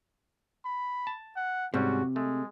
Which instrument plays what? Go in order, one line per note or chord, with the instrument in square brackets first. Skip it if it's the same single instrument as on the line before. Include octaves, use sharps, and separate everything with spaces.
[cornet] B5
[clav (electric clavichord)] A5
[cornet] F#5
[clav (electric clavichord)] G#2 G3 C#4 [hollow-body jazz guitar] C3 [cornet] F#4
[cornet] G#3 [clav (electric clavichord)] A3